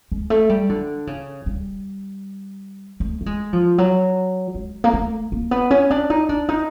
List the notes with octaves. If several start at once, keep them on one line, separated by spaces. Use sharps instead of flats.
G#3
A3
G3
D3
C#3
G3
A3
A3
G#3
F3
F#3
G#3
A#3
A3
A#3
B3
C#4
D4
D#4
D4
D#4